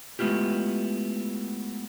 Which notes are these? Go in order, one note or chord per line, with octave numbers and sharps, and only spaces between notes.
G#3 A3 B3 E4 F4 G4